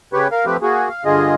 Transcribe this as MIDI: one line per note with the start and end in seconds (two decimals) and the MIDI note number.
0.13 0.28 49
0.13 0.28 67
0.13 0.28 71
0.13 0.28 73
0.32 0.45 70
0.32 0.45 77
0.46 0.57 53
0.46 0.57 57
0.46 0.57 60
0.46 0.57 67
0.46 0.57 71
0.62 0.89 58
0.62 0.89 66
0.62 0.89 68
0.89 1.04 77
1.05 1.35 43
1.05 1.35 50
1.05 1.35 65
1.05 1.35 68
1.05 1.35 75